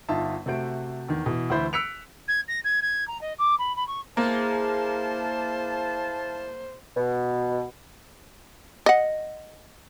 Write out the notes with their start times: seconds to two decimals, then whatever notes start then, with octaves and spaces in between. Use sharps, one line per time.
0.09 G1 D#4 F4 E5 A5
0.46 C3 A3 F#4 C5 D7
1.09 E2 D#3
1.26 B2 E3
1.50 D2 E3 E4 C5 B5
1.73 E6 F#6 B6 C#7 D7 F7
2.28 G#6
2.48 A#6
2.65 G#6
2.82 G#6
3.08 A#5
3.21 D#5
3.39 D6
3.59 B5
3.76 B5
3.88 C#6
4.17 G#3 A#3 E4 C5 F5 A5
6.97 B2
8.86 D#5 F#5